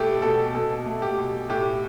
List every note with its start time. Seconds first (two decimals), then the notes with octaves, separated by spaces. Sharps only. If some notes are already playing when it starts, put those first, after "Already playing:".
Already playing: B2 A3 G4 A4
0.22 B2 A4
0.54 B2 A4
0.86 A3
1.02 G4
1.18 B2
1.49 A2 G4